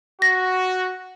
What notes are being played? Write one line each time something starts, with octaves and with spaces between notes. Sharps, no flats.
F#4 A#6